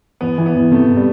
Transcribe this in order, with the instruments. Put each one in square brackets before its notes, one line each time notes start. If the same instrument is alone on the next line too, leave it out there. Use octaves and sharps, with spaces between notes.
[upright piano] E2 [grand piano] B3
[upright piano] E3
[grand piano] B3
[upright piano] E2
[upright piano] C3 [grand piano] A3
[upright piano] C3
[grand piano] G3